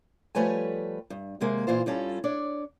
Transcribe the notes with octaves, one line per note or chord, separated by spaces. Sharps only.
F3 G3 A3 B4 C#5 G#5
G2
D#2 C3 G#3 A#3
A#2 E3 F4 C5
G2 G3 C#4 F4 A4
D4 C#5 D5